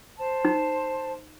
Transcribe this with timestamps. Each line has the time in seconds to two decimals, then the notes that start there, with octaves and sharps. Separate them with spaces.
0.18 C5 A5
0.45 D#4